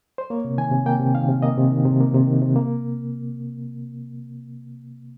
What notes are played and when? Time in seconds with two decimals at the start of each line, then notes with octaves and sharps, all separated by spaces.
0.18 C5
0.30 A#3 C#5
0.45 C3
0.58 D#3 G#5
0.72 C3
0.86 A#3 G5
1.00 C3
1.15 D#3 F5
1.29 C3
1.43 A#3 D#5
1.58 C3
1.72 D#3
1.85 C3
2.00 A#3
2.14 C3
2.27 D#3
2.42 C3
2.56 A#3